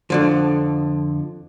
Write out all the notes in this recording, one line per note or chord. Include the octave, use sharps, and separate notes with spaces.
F2 D3 F3